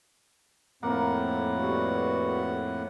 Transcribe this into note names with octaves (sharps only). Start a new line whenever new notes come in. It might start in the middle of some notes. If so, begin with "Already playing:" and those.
F2 A2 A#3 C4 F#5
G3 B3 F#4